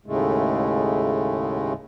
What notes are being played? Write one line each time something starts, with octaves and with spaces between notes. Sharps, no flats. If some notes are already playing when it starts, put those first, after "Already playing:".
D#2 A2 C#3 G#3 A3